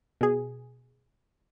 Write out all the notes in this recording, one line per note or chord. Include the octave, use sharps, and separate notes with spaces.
B2 G#4